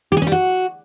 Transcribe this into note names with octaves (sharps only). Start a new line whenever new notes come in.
G4
G#4
C#4
G3
F#4